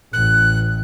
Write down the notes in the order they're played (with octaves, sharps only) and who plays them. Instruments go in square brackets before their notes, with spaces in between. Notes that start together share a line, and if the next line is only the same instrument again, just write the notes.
[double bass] A1 [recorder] F#6